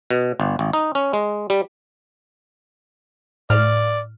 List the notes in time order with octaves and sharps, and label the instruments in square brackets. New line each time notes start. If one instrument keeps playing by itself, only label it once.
[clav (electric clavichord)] B2
G1
G#1
D#4
C#4
G#3
G3
[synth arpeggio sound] A2 F6 [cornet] D5